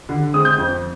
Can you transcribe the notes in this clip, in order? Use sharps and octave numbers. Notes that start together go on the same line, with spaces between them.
D3
G#3 C4 D#6
G6
F2